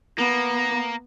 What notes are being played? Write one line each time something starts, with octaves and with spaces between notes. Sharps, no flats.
A#3 B3